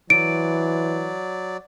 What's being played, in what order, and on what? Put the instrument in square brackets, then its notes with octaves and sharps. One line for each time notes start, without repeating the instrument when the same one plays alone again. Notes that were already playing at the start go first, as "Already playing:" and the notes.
[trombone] E3 [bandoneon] F#3 D5 [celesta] D7